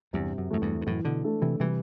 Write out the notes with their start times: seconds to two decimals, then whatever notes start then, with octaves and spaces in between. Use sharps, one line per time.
0.13 E2 G2 C3
0.38 F#2
0.50 F#2 E3 A3
0.62 E2 G2
0.82 G2
0.87 F#2 A2 E3
1.05 B2 D3
1.24 A3 D4 A4
1.42 C3 E3
1.60 C3 E3 G3